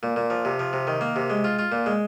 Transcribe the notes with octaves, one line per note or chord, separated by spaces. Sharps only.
A#2
A#2
F3
C3
F3
C3
D#3
A#3
C3
G#3
F4
F4
A#2
G#3